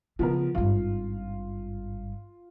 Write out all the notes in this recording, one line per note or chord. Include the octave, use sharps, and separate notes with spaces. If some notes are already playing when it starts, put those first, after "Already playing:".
C#3 F3 B3 C#4 A#4
G#1 G2 F4 F5